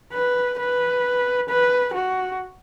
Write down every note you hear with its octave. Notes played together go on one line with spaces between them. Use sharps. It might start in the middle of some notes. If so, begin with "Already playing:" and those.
B4
B4
B4
F#4